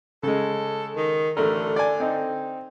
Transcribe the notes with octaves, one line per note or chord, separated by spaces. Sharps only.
C#3 G#3 A4
D#3
A1 D3 A3 A#4
D5 G#5
C4 D#4